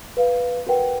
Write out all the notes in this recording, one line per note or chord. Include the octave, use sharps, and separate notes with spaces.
B4 F5
F#4 A#4 B4 F#5 G5